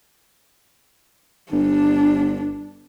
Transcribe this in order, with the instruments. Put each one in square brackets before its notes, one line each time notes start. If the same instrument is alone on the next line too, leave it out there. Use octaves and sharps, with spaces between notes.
[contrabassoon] G1 [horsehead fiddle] D4